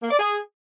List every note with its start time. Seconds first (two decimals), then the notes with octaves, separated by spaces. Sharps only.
0.02 A#3
0.11 D5
0.19 G#4